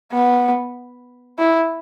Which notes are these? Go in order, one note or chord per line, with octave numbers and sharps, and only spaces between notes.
B3
E4